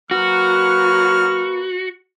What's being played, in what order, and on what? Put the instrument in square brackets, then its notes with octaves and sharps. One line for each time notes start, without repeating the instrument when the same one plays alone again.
[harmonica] F#3 F6 [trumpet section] A#3 B4 C#6 [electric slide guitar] F#4